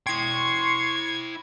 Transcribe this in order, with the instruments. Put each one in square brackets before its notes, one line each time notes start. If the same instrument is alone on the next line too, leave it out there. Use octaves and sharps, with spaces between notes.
[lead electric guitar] E4 G5 [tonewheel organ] C6 C#6 [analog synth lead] G#6